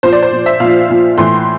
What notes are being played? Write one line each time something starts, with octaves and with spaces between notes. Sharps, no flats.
A#2 F3 C5
D5
C5
A#2 F3
E5
A#2 F3 F5
A#2 F3
A2 E3 C6